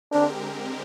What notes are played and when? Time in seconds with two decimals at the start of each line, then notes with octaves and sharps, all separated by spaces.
0.12 D3 G#3 C4 D4 G4 A#4